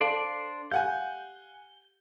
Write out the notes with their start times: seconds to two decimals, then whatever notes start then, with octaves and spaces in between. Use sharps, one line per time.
0.01 D4 A4 C5 D5 F5 A5
0.71 G4 F5 F#5 G#5 G6